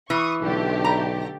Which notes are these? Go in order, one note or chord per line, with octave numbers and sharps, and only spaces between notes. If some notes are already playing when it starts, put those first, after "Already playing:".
E3 C#6 D#6
B1 D3 A3 G4
A#5